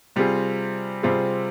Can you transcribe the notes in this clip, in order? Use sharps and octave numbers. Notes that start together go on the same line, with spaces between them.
C3 G3 C4 F4 G#4
C3 G3 C4 F4 G#4